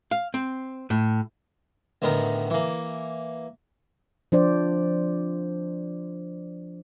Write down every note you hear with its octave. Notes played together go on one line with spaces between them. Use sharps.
F5
C4
A2
D2 A2 D#3 B3 A#4
E3 A#3
F3 D4 C5 D5